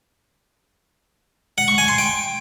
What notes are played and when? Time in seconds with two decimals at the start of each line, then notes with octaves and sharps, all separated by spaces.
1.58 F#5
1.68 C#6
1.78 G#5
1.88 C6
1.98 G5